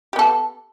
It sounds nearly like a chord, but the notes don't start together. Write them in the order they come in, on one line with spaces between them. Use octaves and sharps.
G4 B3 A4